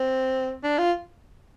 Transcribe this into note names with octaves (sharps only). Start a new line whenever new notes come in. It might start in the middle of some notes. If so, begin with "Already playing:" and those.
Already playing: C4
D4
F4